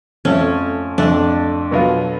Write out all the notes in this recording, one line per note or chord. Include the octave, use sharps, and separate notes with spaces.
F2 F3 A3 C#4
F2 F3 A3 D4
B2 F#3 B3 F4